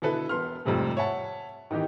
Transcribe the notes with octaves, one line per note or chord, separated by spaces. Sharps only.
B2 D3 E4 A4 B4
E1 B3 C6 F6
F2 G#2 C3 G3 A3
C#5 E5 F#5 A5
D#3 E3 B3 D#4 G4